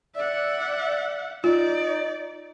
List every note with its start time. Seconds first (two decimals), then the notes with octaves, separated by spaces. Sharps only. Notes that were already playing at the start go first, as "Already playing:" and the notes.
0.16 D5 E5 F#5
1.44 D#4 F4 D5